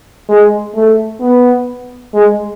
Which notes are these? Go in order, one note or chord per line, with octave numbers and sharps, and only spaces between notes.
G#3
A3
B3
G#3